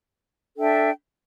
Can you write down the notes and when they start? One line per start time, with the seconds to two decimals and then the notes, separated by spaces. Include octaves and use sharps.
0.57 D4 A4 E5 G5